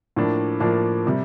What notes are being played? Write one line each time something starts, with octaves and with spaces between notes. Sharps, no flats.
A2 F3 A#3 D4
A2 F3 A#3 D4
C3 G3